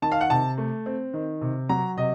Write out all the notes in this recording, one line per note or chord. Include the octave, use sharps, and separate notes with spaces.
D#3 A5
F5
F#5
C3 A5
A3
C4
D#3
C3
F#3 A#5
C3 D#5